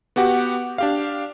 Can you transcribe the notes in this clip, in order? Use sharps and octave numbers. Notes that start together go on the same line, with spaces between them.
B3 F#4 G4 F#5
D4 G4 F5